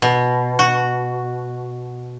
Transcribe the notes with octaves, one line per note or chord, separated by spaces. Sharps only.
B2
F#4